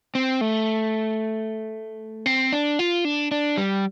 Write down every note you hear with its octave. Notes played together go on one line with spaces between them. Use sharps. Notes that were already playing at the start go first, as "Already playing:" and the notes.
C4
A3
C4
D4
F4
D4
D4
G3